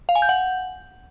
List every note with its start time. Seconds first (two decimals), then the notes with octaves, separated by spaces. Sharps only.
0.09 F5
0.15 G#5
0.22 G6
0.29 F#5